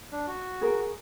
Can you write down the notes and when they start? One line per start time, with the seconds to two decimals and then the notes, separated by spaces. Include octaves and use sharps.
0.12 D4
0.27 F#4
0.61 G#4 A#4